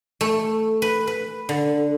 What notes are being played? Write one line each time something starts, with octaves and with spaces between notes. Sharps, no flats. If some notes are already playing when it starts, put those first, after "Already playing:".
A3
B4
B4
D3